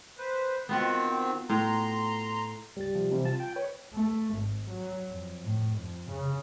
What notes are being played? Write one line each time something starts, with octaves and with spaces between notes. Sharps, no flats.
B4 C5
D#3 B3 C4 F4 F#4
A2 A#5 C6
C#2 G2 G3 A6
C3 F3
C3 E3 G3
F4 A5
G5
B4 C#5
A3
G#1
F#3
F2
A2
F2
C#3